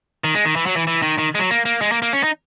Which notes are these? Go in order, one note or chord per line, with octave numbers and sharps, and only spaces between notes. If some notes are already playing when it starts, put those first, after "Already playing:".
D#3
G#3
D#3
E3
F#3
E3
E3
D#3
D#3
G#3
F#3
A#3
A#3
G#3
A#3
A#3
C#4
D#4